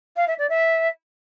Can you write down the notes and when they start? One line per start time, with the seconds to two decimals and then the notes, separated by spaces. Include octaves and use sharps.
0.16 F5
0.27 E5
0.38 D5
0.49 E5